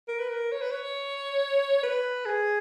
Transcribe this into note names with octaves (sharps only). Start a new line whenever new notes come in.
A#4
B4
A#4
C#5
B4
C#5
B4
G#4